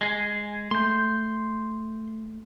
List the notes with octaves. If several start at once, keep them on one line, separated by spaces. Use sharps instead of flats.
G#3 G#4
A3 C6 G6